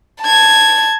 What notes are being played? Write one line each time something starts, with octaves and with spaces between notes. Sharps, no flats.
A5 G#6